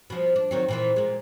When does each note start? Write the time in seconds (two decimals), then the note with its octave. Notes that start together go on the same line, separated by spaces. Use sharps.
0.10 B2 F3
0.36 D4
0.51 D#3 F#3 C4
0.68 A#2 E3 C4
0.96 A#2 G#3